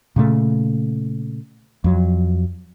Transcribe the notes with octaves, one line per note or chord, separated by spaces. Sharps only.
A#2 C#3 A3
F2 F#3